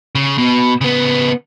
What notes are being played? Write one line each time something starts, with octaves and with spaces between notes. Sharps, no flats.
C#3
B2
C#3 B3